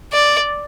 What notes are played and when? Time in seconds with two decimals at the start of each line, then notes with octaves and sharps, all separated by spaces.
0.13 D5